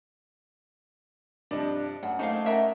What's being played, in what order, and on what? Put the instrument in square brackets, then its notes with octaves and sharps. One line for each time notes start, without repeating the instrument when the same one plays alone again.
[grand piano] G2 C3 F3 [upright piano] D4 D#5
[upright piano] F#2 [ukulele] F#5
[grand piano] A3 A#3 D#4 [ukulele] C5 F5
[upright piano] C#4 A#4 [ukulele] D5 E5 F#5